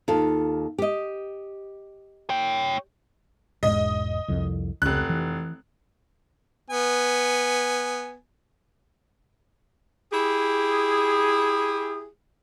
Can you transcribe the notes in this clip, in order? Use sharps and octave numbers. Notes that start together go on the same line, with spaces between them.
D#2 F4 A4
G4 D#5
C#5 G5
E1 G#2 D#5
C2 F2
F1 C#2 F#6
E3
B3 G#5
E4 G4 G#4